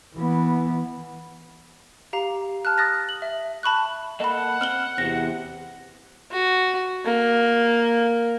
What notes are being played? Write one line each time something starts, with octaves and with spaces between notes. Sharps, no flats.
E3 B3
G4 F5 A#5
A5 F6 F#6
D#6 F#6 A6 A#6
F#7
E5
A5 B5 C#6 F#6
A#3 A4 D#5 F#5 B5
C4 F6 F#7 G7
E2 C3 C4 F#4 A#6
F#4
A#3